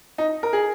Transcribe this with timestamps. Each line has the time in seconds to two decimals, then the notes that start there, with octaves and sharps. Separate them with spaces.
0.18 D#4
0.43 A#4
0.53 G#4